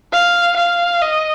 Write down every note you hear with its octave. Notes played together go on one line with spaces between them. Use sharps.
F5
F5
D#5